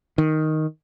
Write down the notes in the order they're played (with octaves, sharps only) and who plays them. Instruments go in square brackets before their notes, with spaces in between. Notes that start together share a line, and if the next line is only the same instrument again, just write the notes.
[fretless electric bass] D#3